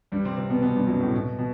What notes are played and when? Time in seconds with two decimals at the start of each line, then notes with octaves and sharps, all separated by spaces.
0.12 G2 G3
0.25 C3 C4
0.37 C3 C4
0.49 B2 B3
0.62 B2 B3
0.76 G2 G3
0.87 F#2 F#3
1.00 A2
1.13 B2
1.39 B2